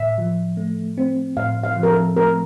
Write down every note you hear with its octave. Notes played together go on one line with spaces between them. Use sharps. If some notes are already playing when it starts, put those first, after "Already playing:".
Already playing: A2 E5
F3
A3
C4
A2 F5
F5
F3
A#4
A4
A3 A#4